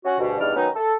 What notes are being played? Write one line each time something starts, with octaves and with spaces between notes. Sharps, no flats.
C#4 F#4
D2 G2 B2
E2 G2 E3 D#4 D5 F6
D#3 F#3 B3 C#4 D#4
A4